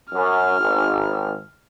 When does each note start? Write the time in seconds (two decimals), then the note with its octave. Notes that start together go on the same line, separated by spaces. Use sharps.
0.14 F#2 F6
0.59 G#1